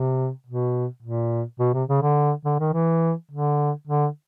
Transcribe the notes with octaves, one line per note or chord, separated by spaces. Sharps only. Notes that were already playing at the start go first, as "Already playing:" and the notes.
Already playing: C3
B2
A#2
B2
C3
C#3
D3
D3
D#3
E3
D3
D3